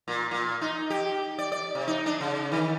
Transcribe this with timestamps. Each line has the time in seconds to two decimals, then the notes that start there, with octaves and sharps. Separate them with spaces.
0.08 A#2
0.31 A#2
0.61 D#4
0.90 G4
1.38 D5
1.52 D5
1.75 C3
1.87 D#4
2.06 D4
2.21 C#3
2.52 D#3